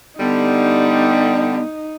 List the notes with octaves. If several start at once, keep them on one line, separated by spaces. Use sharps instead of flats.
D3 G3 B3 D#4